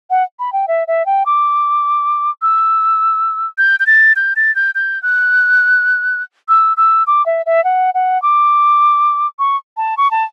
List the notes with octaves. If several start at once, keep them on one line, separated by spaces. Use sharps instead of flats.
F#5
B5
G5
E5
E5
G5
D6
E6
G6
G6
A6
G6
A6
G6
G6
F#6
E6
E6
D6
E5
E5
F#5
F#5
D6
C#6
A5
C#6
A5